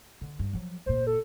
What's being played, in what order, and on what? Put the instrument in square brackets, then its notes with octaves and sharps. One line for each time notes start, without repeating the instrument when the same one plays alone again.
[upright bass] D3
G2
F3 F#3
[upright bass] F#1 A#2 [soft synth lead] C5
[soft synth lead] A4